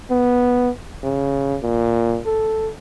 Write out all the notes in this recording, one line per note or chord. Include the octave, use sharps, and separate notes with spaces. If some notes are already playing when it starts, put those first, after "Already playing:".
B3
C#3
A#2
A4